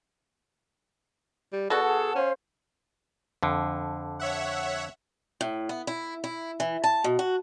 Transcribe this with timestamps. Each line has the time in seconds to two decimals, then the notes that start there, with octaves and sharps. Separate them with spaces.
1.53 G3
1.70 B2 F#4 G#4 A4 D5
1.83 G#4 F#5 A5
2.16 C#4 C5 F5
3.43 F2 D3
4.20 C#5 E5 F#5
5.41 A2
5.69 B3
5.87 E4
6.24 E4
6.60 E3
6.84 A5
7.04 B2
7.19 F#4